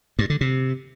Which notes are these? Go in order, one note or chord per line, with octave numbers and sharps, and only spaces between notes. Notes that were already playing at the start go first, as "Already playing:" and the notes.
G2
D3
C3